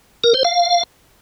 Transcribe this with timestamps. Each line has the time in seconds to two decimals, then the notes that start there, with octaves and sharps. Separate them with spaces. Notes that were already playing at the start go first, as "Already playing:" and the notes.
0.24 A#4
0.34 C5
0.45 F5